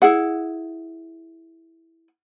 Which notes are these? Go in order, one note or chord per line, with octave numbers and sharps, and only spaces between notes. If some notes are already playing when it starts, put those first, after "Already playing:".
E4 G#4 F#5